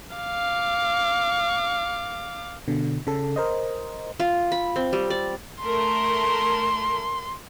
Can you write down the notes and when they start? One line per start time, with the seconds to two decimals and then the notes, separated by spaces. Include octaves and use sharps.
0.16 F5 D6
2.68 B2 D3
3.07 C#3 A4
3.36 A#4 C5 D#5
4.20 F4
4.52 B5
4.76 C4
4.93 G3
5.10 D5
5.62 A3 A#4 C6